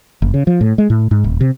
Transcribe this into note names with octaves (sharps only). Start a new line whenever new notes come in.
F#1
C#3
F3
A2
G#3
A2
G#2
D#1
C3